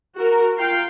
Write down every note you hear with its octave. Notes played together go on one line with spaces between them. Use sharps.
F#4 A#4
F4 F5 G5